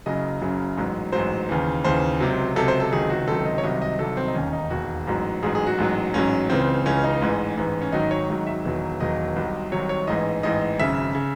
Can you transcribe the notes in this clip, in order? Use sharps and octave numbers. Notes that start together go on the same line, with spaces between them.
F#1 F#2 C#3 F#3 D#5
F#1 F#2 C#3 F#3
A1 G#2 F#3
A1 G#2 F#3 C5
D#2 C#3 E3
D#2 C#3 E3 C5
C#2 C3 F#3
C#2 C3 F#3 A4
C5
A4
C#2 C3 D#3 F#3 G#4
F#4
C#2 C3 D#3 F#3 A4
D#5
C#5
C2 C3 D#3 F#3 D#5
D#5
C2 C3 D#3 F#3 A4
C4
D#4
E1 D#2 D#3 C#4
D#4
E1 D#2 D#3 F#4
A1 G#2 F#3
A1 G#2 F#3 G#4
G#4
F#4
A1 G#2 F#3
A1 G#2 F#3 C#4
C#2 C#3 E3 C4
C#2 C#3 E3 C#4
D#4
A1 G#2 E3
A1 G#2 E3
C#4
G#1 G#2 D#3 F#3 D#4
C#5
G#1 G#2 D#3 F#3
E5
E1 E2 D#3 F#3
E1 E2 D#3 F#3 D#5
C2 C3 D#3 F#3
C2 C3 D#3 F#3 C#5
C#5
A1 G#2 E3 D#5
A1 G#2 E3 D#5
G#1 F#2 C#3 E5
C#3